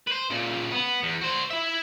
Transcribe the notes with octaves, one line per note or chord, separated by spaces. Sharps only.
B4 C5
A#2 C#3
B3
E2
F#4 C5
E4 E5